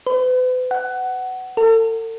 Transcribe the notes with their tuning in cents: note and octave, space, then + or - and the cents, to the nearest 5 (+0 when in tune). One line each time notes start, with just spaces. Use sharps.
B4 +40
F#5 +15
A4 +40